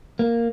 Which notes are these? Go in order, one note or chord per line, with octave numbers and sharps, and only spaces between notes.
A#3